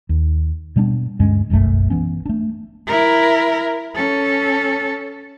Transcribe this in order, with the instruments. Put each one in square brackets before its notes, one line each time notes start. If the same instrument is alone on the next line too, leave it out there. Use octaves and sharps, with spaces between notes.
[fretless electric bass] D#2
B2 G3 B3 D4
D2 G2 G#3 C#4
F#1 B1 F#2 A3
E3 B3 C#4
A3 D4
[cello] E4 A#4
C#4 A4